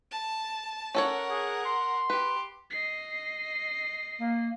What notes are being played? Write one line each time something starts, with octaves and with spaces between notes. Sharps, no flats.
A5
C#4 A4 A#4 C#5 F#5
G#4
C6
G4 B4
D#5 C7
A#3